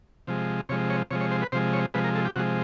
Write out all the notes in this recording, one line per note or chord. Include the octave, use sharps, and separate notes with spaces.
C3 F3 G#3
C3 F3 G#3 C#5
C#5
C3 F3 G#3 C#5
C#5
C5
B4
C3 F3 G#3 C5
C#5
C3 F3 G#3 B4
A#4
A4
G4
C3 F3 G#3 F#4